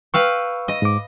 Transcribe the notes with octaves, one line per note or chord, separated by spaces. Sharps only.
B4 F5 G5 C#6 E6
D#5
G#2 D6